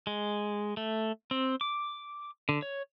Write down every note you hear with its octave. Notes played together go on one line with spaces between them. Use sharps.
G#3
A3
C4
D6
D3
C#5